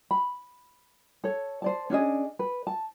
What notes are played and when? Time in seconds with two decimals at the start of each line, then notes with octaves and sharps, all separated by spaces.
0.11 B5
1.24 A4 C#5
1.62 C5 D5 A5
1.90 C#4 D4 G#4 D#5
2.39 B4
2.67 A5